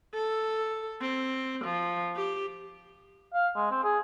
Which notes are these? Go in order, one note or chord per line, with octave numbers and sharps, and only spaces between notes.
A4
C4
F3
G4
F5
G#3
C4
G#4